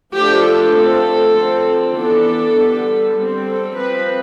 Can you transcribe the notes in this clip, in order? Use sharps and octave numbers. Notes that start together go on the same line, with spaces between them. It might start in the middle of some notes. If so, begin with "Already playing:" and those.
F3 A3 D4 G4
A4
F3 A3 C4
D3 F3 C4
E3 B3 D4 A4
D3 G3 B3 D4
G3 C4
A4
F3 C4 B4